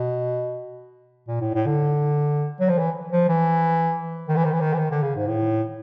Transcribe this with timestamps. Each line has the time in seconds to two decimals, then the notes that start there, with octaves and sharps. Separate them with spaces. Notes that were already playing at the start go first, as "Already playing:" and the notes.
Already playing: B2
1.28 A#2
1.41 A2
1.54 A2
1.66 D3
2.60 F#3
2.69 F3
2.79 E3
3.12 F3
3.29 E3
4.29 D#3
4.36 E3
4.45 D#3
4.52 E3
4.61 D#3
4.74 E3
4.78 D#3
4.91 D3
5.03 C#3
5.16 G#2
5.28 A2